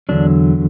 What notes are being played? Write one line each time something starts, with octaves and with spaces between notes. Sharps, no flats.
E2 D3 F#3 D4